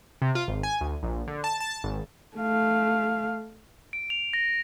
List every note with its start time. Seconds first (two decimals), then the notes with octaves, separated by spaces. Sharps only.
0.22 C3
0.35 F4
0.48 G#1
0.63 G#5
0.81 D2
1.03 A#1
1.27 D3
1.44 A5
1.60 A5
1.83 G#1
2.37 A3 F5
3.93 D7
4.10 F7
4.33 A#6